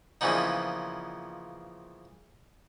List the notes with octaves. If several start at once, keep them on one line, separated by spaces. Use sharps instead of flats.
A#2 C#3 E3 F3 B3 D#4